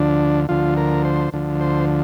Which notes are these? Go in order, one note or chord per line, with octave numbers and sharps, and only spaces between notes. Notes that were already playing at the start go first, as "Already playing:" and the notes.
Already playing: D2 D3 F3 D4
D2 D3 F3 F4
A#4
C5
D2 D3 F3
C5